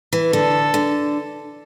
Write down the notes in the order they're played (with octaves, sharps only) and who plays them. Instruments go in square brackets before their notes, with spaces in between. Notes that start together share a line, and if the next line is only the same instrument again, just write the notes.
[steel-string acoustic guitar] E3
[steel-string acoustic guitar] D3 [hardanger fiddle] A4
[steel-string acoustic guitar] D3